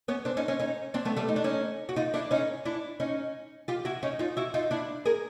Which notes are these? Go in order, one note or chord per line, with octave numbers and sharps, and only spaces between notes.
B3 C#4
C4 D4
C#4 D#4
C#4 D#4
C#4 D#4
C4 D4
A3 B3
G3 A3
D#4
D4
C#4 D#4
F#4
D#4 F4
D4 E4
C#4 D#4
D4 E4
C#4 D#4
F4 G4
E4 F#4
C#4 D#4
D#4 F4
E4 F#4
D#4 F4
D4 E4
G#4 A#4